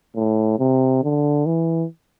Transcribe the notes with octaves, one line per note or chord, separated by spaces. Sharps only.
A2
C3
D3
E3